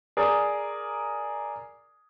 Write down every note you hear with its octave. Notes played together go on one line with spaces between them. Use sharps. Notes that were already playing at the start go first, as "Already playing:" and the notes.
G#4 A#4 D5